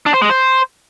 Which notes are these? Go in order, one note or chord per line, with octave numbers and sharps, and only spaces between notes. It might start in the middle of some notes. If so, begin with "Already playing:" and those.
D4
C5
G#3
C5